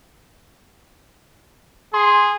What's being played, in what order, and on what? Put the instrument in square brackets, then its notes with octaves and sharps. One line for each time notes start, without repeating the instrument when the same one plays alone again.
[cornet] G#4 [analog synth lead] C6